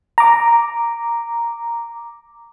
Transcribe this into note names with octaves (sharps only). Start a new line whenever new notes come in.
A#5 D6